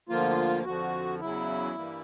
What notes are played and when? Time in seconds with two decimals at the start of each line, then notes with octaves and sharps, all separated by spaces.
0.09 D2 D3 F3 A#3 F4
0.65 F2 D3 F3 F#4
1.20 E2 C#3 F#3 E4
1.76 G2 E3 G3 A#3